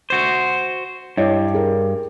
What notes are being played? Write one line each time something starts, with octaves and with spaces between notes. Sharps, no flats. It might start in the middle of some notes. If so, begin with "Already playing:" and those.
F#4 C5
G2 E4 C#5 D#5
G#4 A#4